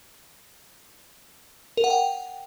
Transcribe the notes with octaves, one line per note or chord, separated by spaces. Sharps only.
A#4
F#5
G5